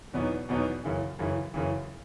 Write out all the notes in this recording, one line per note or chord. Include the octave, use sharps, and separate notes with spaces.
E2 B2 F#3 B3 D#4
E2 B2 F#3 B3 D#4
F#2 C#3 E3
F#2 C#3 E3
F#2 C#3 E3